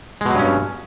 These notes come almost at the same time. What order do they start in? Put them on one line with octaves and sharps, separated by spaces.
G#3 B2 F#3 G2 C#4